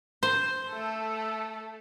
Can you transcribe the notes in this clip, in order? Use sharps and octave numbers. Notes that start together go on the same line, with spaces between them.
C5
A3 A4